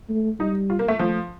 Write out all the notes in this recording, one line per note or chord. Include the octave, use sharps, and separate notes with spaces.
A3
G3 D#4
F4
A#3
A3
F3 A3